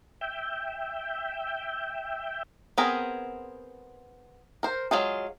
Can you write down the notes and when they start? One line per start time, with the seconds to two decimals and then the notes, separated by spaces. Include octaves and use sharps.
0.21 E5 G5
2.78 B3 C4 G#4 A#4
4.63 A#4 C5
4.91 F#3 G#3 F4 G#4